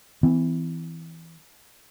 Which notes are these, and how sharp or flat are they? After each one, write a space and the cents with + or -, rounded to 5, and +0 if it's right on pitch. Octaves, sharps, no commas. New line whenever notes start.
E3 -5 C4 -45